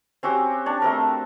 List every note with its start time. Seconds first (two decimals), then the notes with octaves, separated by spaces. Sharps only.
0.23 C4 C#4 F#4 G4
0.66 D4 C#5
0.82 A3 C4 A#4